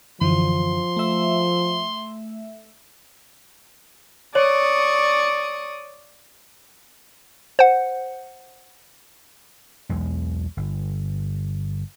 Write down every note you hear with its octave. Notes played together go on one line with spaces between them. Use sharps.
F#2 D3 E3 F3 C6
A3 E5
C#5 D5 C#6 D#6
C5 F#5
B1 E2 G#3
G1